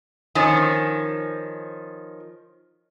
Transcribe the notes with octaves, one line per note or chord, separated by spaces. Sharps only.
D#3 F3 C#4